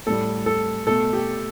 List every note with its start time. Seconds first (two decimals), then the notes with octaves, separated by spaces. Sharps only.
0.07 A2 G3 A4
0.46 A4
0.87 B2 A3 A4
1.13 G4